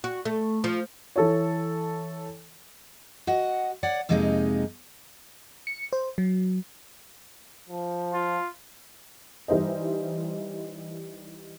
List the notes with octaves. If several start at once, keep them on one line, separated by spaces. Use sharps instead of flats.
F#4
A3
F3
E3 A4 C#5
F#4 D#5 F#5
C#5 D5 F#5
F2 C3 G#3 A#3 C4 D#4
C#7
C5
F#3
F3
F4
E3 G3 D#4 C5 D#5